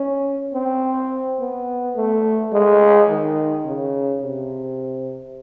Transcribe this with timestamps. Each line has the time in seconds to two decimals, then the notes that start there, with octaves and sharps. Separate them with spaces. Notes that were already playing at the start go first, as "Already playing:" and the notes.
Already playing: C#4
0.54 C4
1.40 B3
1.96 A3
2.52 G#3
3.09 D#3
3.66 C#3
4.22 C3